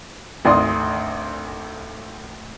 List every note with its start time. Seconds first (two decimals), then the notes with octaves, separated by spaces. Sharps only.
0.45 G#1 D2 D5 C6 D#6